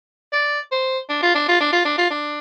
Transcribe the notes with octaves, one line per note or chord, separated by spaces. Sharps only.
D5
C5
D4
F4
D4
F4
D4
F4
D4
F4
D4